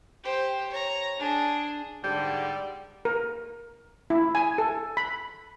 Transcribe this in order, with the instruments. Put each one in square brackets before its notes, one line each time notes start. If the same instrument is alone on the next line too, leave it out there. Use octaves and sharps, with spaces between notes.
[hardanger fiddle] G4 C5
C#5 A#5
D4 G#4
[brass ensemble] G#2 D3 [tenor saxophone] G3 [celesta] G6
[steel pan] A#4
E4
G#5
A4
B5